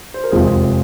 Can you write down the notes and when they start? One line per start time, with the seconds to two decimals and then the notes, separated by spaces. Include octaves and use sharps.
0.14 C5
0.24 A#4
0.31 F1 F2 F3 G#3 C4 G#4